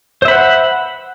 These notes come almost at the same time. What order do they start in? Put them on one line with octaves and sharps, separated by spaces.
C5 E5 B5 F#5